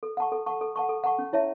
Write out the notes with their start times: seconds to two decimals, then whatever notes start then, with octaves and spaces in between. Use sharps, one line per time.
0.03 A4
0.17 F#5 A5 C#6
0.32 A4
0.46 F#5 A5 C#6
0.61 A4
0.76 F#5 A5 C#6
0.89 A4
1.04 F#5 A5 C#6
1.19 C#4
1.33 E4 C#5 E5 A5